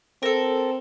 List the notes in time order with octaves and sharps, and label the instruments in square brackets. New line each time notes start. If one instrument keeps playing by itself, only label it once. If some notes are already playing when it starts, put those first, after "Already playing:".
[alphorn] C4 [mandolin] A4 A#4